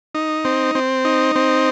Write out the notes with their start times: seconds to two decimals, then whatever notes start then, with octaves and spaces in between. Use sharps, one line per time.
0.15 D#4
0.45 C4
0.75 C4
1.05 D#4
1.36 C4